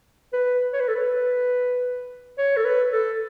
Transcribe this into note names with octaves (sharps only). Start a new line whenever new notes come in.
B4
C#5
B4
A4
B4
C#5
A4
B4
A4